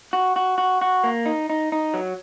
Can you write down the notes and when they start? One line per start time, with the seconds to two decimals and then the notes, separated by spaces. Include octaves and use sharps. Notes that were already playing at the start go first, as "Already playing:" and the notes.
0.13 F#4
0.36 F#4
0.58 F#4
0.81 F#4
1.04 A#3
1.26 D#4
1.50 D#4
1.72 D#4
1.94 F#3